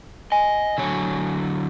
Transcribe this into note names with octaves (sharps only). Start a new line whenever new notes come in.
D#5 G#5
D3 F#3 C#5